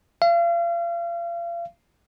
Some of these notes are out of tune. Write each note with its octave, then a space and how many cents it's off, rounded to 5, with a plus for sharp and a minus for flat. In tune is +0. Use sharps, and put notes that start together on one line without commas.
F5 -35